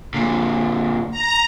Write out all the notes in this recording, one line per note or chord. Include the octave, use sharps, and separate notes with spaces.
A#2 D3
A#5